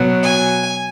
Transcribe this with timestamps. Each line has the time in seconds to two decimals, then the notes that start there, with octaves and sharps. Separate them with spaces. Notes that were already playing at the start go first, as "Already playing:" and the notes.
Already playing: B2 F#3
0.23 G#5